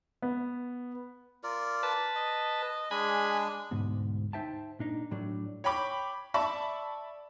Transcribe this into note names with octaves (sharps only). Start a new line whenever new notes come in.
B3
F4 A#4 D5
B4 A5
D#5
G#3 D4 G#4 G#5 B5
D2 G#2 B2
D#4 C5 E5 G5 A5
A#2 D4 D#4
A2 F#3 A3 D4
C#5 G5 B5 D6
D5 E5 A5 B5 C#6